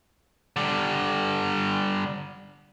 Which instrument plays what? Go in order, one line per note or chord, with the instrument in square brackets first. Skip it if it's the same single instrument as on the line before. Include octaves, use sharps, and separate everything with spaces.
[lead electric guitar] D3 G3